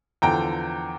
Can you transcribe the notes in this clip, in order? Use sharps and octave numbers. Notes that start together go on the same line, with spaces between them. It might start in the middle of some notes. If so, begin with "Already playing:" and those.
E2 D3 F3 G5 A#5